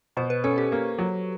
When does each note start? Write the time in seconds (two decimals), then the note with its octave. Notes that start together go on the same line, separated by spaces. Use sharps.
0.17 B2 C5
0.30 B4
0.44 C#4 A4
0.58 G4
0.72 A#3
0.98 F#3